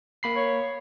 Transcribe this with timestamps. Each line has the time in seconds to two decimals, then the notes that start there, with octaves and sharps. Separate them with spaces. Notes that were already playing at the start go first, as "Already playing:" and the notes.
0.23 A#3 B5 C7
0.36 C#5